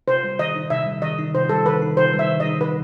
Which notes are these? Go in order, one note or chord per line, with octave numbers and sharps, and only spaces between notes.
C3 C5
G3
D#3 D#5
D#4
C3 E5
G3
D#3 D#5
D#4
C3 C5
G3 A4
D#3 B4
D#4
C3 C5
G3
E5
D#3
D#5
D#4
B4